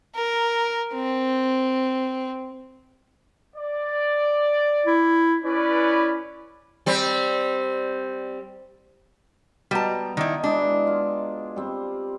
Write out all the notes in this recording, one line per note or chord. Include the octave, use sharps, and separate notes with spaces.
A#4
C4
D5
E4
C#4 E4 B4 D5
G3 C4
B2 G3 A5 A#5
D#3 E4 D5 D#5 G5
G#3 D4 E4
F4 G#4
G3 C4